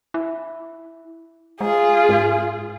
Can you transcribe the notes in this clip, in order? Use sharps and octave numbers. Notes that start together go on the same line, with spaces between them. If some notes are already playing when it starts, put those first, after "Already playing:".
E4
G#3 F4 G#4
G#2